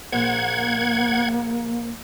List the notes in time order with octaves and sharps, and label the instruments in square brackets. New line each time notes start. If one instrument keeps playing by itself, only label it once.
[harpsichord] A#1 [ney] A#3 [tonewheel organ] F#5 G#6